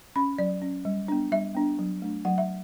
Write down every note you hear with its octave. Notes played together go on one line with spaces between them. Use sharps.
C#4 B5
F#3 D5
C#4
G3
B3 D4
G3 E5
B3 D4
F#3
A3 D4
F#3 F#5
E5